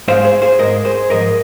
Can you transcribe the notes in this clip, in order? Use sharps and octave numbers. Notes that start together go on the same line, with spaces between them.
G#2 G#3 C5 F5
G#4 C5
G#4 C5
G#2 G#3 A#4 D#5
G#4 C5
G#2 F3 G#3 A#4 D#5